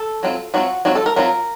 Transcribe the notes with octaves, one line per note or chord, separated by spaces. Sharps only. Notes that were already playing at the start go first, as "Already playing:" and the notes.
Already playing: A4
F#3 C4 F4
F#3 C4 F4 F#4
F#3 C4 F4 F#4
A4
A#4
F#3 C4 F4 A#4